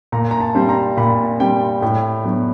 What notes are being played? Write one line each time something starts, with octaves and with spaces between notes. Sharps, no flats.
A#2 A#5
A#5
A5
G3 C4
A#5
A#2 B5
G3 C4 G5
A2 G5
F#3 B3 D4